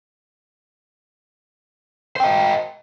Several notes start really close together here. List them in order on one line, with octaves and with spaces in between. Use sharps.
C5 G5 D#5